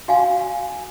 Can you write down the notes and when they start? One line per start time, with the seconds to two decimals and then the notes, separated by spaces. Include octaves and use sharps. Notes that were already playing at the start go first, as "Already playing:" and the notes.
0.08 F#4 F5 G#5